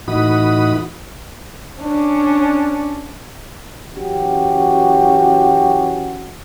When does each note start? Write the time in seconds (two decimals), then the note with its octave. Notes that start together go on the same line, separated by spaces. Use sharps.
0.08 A2 E3 D#4 F#4 B5 D#6
1.81 C#4 D4
3.95 F#2 E3 C#4 F#4 G4